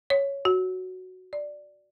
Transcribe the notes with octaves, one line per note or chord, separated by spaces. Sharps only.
C#5
F#4
D5